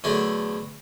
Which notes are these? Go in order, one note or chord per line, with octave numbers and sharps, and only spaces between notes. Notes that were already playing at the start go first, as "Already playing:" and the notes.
E2 D3 F#3 A3